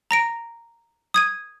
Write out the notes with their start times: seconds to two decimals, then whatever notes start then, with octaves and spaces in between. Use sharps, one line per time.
0.11 A#5 A#6 D7
1.14 D#6 G#6 D#7